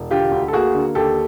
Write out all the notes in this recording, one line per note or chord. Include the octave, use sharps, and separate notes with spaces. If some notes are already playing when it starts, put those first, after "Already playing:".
Already playing: E1
D3 F4 G4
D2
A4
A#3 F#4 G#4
D3
D#2 G4 A4